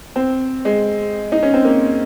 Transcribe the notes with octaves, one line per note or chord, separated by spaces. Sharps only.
C4
G#3
D#4
C#4
C4
A#3